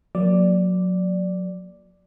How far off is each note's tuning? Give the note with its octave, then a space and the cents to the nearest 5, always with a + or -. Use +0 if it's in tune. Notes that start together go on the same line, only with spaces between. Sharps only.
F#3 -25 A#3 +0 D5 +0